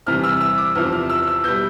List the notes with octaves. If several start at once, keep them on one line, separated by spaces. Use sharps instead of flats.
E2 C3 E3 G3 F6
E6
E6
D6
E2 C3 F3 F6
F6
E6
E6
B2 G3 G6